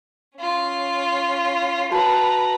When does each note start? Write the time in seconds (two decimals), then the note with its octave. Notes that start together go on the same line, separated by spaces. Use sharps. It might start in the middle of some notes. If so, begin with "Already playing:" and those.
0.38 C#4 F4
1.92 F#4 B4 A5 A#5